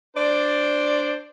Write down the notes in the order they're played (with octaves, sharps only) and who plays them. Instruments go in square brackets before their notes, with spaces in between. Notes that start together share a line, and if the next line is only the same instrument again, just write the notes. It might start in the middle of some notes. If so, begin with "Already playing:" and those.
[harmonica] D4 C5 [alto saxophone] D5